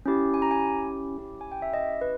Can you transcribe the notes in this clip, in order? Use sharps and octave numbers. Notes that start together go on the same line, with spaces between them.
C#4 E4 G4
G#5
A#5
G#5
C#4 E4 G4
G#5
G5
E5
D#5
B4